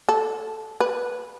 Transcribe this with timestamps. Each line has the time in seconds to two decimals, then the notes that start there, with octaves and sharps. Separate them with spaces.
0.09 A4
0.80 B4